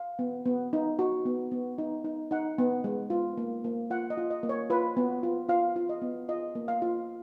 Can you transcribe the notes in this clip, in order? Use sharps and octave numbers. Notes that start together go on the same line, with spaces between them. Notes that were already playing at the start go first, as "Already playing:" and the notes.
Already playing: F5
B3
B3
D#4
F#4
B3
B3
D#4
D#4
D#4 F#5
B3
G#3
F4
A#3
A#3
F4 F#5
D#5
F4
D#5
A#3
C#5
F4 B4
B3
F4
F4 F5
F4
D#5
B3
F4 D#5
A#3
F5
F4